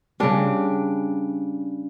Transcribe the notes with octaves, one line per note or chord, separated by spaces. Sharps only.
C#3 G3 D4